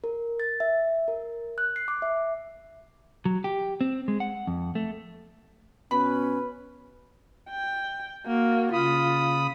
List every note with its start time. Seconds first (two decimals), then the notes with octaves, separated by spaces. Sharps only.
0.04 A#4
0.40 A6
0.60 E5
1.08 A#4
1.58 F#6
1.76 C7
1.88 D6
2.02 E5
3.25 F#3
3.44 G4
3.81 C4
4.08 G#3
4.20 F#5
4.47 F2
4.75 A3
5.91 B2 C#4 B4 B5
7.50 G5
8.26 A#3 F#4
8.73 C#3 F4 B5 D#6